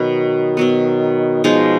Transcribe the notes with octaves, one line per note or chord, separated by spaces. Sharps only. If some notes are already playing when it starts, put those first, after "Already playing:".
Already playing: B2 D#3 F#3 B3
B2 F#3 B3
B2 F3 G#3 D#4